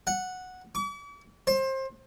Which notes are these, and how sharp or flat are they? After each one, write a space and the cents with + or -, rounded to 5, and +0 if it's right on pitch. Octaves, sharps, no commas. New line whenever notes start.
F#5 -5
D6 -45
C5 +25